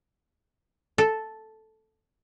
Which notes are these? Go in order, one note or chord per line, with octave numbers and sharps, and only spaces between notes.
A4